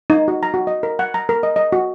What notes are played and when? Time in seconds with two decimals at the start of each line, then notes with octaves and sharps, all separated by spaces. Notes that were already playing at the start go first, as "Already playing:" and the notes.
0.10 D#4
0.28 F#4
0.43 A#5
0.54 F#4
0.67 D#5
0.83 A#4
0.99 F#5
1.14 A#5
1.29 A#4
1.43 D#5
1.56 D#5
1.72 F#4